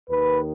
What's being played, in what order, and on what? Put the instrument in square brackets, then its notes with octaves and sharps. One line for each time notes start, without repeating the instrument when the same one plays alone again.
[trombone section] D#2 B4
D#3